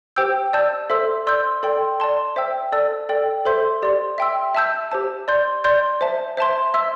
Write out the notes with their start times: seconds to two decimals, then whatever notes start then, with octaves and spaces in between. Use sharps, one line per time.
0.16 G4 C5 G5 E6 G6
0.53 D5 A5 E6 G6
0.90 A4 C5 E5 C6 E6
1.27 D5 C6 E6 G6
1.63 A4 D5 G5 C6
2.00 D5 A5 C6
2.36 C5 E5 G5 E6
2.72 A4 D5 A5 E6
3.09 A4 D5 G5
3.45 A4 C5 E5 C6 G6
3.82 G4 D5 C6
4.18 E5 G5 C6 E6
4.55 E5 A5 E6 G6
4.91 G4 C5 A5
5.28 D5 C6 G6
5.64 D5 C6 G6
6.01 C5 E5 A5
6.37 C5 E5 A5 C6
6.74 E5 C6 E6